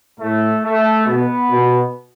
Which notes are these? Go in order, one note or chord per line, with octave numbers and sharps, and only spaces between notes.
A2 A3
A3
B2 B3
B2